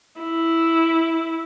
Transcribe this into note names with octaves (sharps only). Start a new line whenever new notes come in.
E4